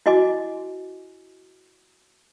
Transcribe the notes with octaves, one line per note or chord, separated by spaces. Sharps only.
E4 F#4 D#5 G#5 D6